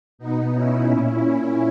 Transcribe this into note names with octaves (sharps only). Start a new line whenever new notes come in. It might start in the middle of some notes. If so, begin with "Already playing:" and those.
B2 B3 D#4
C#4 E4
A#2
C#4 E4